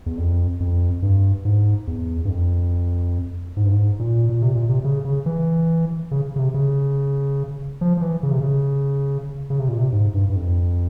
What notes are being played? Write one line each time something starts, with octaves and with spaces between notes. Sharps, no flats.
E2
F2
F2
G2
G#2
E2
G2
F2
G#2
G2
G#2
A#2
A#2
C3
A#2
C3
C#3
C#3
E3
C#3
C#3
C3
C#3
F3
F3
E3
C#3
C3
C#3
C#3
C3
A#2
C3
G#2
G2
G2
F2